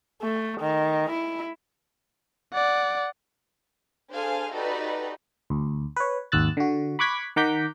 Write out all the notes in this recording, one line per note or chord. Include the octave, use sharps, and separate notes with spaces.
A3
D#3
E4
D5 F#5
D4 G#4 A4 C5 F5 G#5
D#4 F#4 G4 A4 B4 D5
D2
B4 C#5
G#1 D#2 E6 F#6 A6
D3 F#4
B5 C#6 D6 F#6 G#6 B6
D#3 F#5 A#5 D6 G6 B6